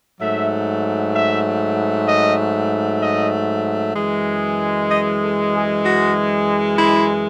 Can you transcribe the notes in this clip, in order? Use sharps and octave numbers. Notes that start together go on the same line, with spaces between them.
G#2 F#3 A3 E5
E5
D#5
D#5
F#2 E3 G#3
D#5
A4
G#4
F#4
E4